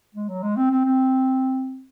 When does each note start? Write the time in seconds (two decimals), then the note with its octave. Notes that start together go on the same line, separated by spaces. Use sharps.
0.15 G#3
0.28 F#3
0.42 G#3
0.56 C4
0.70 C4
0.85 C4